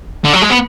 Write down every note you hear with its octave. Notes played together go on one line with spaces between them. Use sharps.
D3
F#3
G#3
B3